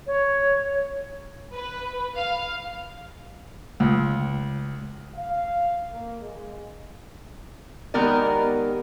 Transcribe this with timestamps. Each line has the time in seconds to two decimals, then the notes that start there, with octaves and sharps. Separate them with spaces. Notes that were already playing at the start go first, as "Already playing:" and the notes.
0.07 C#5
1.54 B4
2.17 F5
3.80 C#2
5.15 F5
5.91 A#3
6.21 G#3
7.94 D#3 G#3 B3 G4 A#4 D5